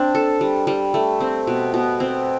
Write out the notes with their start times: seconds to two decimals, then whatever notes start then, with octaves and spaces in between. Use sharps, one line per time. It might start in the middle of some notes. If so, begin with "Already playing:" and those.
Already playing: C4 D4
0.15 A4
0.41 G3
0.67 G3
0.94 A3
1.20 C4
1.47 B2
1.74 B2
2.00 C4